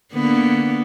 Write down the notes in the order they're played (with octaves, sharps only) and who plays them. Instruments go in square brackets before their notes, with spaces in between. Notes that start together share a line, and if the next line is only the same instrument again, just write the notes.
[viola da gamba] D3 A#3 B3